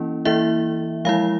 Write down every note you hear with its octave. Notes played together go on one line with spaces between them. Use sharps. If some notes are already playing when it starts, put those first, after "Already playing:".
Already playing: E3 A#3 C#4 E4
E3 A#3 E4 E5
F3 G#3 E4 F5